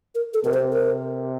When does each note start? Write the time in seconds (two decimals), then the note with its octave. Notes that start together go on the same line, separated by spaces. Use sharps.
0.15 A#4
0.34 A4
0.45 C3 A#4
0.54 C5
0.73 A#4